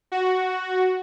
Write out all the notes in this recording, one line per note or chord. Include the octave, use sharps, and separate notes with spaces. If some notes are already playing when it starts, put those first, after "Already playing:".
F#4